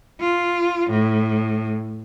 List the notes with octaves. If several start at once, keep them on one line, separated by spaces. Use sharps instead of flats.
F4
A2